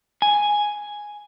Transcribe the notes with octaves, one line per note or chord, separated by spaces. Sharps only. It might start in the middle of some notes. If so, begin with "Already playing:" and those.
G#5